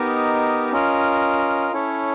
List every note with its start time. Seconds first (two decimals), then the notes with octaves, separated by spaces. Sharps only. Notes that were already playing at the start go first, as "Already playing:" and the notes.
Already playing: B3 D#4 G4 A#4 D#5
0.72 C#4 F4 A#4 D#5
1.73 C#4 E4 A4 C#5